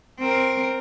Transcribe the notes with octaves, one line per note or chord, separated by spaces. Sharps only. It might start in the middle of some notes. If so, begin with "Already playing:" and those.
C4 A#4